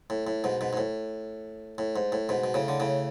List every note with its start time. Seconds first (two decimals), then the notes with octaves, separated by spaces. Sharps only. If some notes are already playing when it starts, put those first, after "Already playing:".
0.10 A2
0.27 A2
0.44 G#2 B2
0.61 G#2 B2
0.73 G#2
0.77 A2
1.78 A2
1.96 G#2
2.12 A2
2.29 G#2 B2
2.44 B2
2.54 A2 C#3
2.68 D3
2.80 A2 C#3